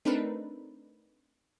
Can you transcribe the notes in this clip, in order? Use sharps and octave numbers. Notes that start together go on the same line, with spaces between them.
A3 C4 D4 D#4 A#4 B4